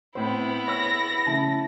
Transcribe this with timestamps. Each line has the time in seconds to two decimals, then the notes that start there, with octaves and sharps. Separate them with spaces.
0.15 A2 B3 C4 E4 C5
0.68 C#5 E6 A#6
1.26 C#3 A3 E4 A5